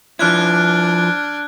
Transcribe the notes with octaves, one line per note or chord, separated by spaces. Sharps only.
F3 D4 E4 F6 F#6 G#6